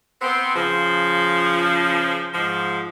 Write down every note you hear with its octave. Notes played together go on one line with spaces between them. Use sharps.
B3 C4
C#3 F3
G#2 F3